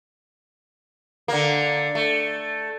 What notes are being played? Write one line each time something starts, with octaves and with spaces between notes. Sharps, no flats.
D3 A#3
A3